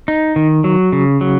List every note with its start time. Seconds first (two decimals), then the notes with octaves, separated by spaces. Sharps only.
0.08 D#4
0.36 D#3
0.64 F#3
0.92 C#3
1.21 F#3